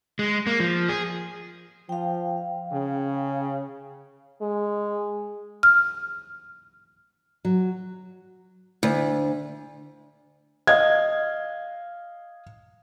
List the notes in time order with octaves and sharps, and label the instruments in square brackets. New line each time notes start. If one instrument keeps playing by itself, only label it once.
[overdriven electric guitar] G#3
A#3
F3
G#4
[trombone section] F3 [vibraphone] F5 G5
[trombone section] C#3
[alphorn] G#3
[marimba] F6
[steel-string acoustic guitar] F#3
D2
[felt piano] D#5 F5 G#6